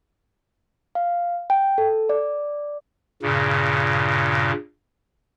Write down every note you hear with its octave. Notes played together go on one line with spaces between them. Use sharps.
F5
G5
A4
D5
G2 A#2 C#3